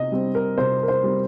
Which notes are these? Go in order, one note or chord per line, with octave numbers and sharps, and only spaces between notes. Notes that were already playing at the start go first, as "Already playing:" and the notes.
Already playing: C3 D#5
G3 C4
A#4
C3 C5
A#4
C5
G3 C4